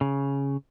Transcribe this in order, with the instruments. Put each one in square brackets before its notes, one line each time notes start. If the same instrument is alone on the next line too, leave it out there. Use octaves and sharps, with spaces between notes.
[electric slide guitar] C#3